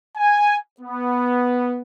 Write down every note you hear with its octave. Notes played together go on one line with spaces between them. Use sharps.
G#5
B3